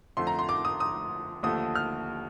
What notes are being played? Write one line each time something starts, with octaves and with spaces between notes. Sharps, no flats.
F2 D3 F3 A3 C6
A#5
C6
D6
D#6
D#6
D#2 D3 F3 A3 D#6
F6